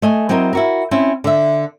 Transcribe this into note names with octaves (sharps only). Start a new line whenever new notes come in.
A3 D#5 G#5
F#3 C4 E4 A#4 D#5
E4 F#4 A#4
C4 C#4 E4
D3 E5